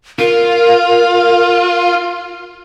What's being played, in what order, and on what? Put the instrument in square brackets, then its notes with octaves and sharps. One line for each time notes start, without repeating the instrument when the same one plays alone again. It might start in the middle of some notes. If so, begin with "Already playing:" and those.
[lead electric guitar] F4 [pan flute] A#4